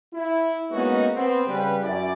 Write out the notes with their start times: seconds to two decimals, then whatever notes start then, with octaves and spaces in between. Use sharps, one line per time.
0.14 E4
0.72 G#3 A#3 B3 C#4 D#4 F#4
1.15 B3 C4
1.48 C#3 G3 B4
1.83 F#2 E4 D5